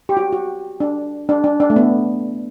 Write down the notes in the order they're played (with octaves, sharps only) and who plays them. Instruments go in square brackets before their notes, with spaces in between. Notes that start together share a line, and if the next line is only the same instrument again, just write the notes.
[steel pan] G4
F#4
F#4
D4
D4
D4
D4
A3
B3